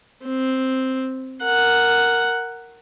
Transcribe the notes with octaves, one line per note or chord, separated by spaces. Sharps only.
C4
A#4 F#5